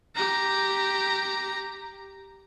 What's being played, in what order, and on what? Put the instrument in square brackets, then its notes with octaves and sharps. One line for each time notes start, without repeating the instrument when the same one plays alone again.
[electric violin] G4 A#5